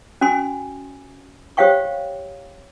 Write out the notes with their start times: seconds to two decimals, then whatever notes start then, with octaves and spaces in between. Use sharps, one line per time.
0.21 C#4 F#4 G#5 C6
1.57 G4 C5 C#5 F5 G5 C#6